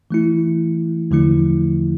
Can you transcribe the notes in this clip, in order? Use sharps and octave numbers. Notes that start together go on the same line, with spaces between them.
E3 A3 E4
E2 D3 F3 A3 E4